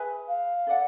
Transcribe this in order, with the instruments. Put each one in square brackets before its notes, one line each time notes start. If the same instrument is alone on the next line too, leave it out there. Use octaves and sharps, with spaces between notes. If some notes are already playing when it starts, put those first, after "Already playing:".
Already playing: [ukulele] G#4 B4 E5 G#5
[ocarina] F5
[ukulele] A4 D5 F#5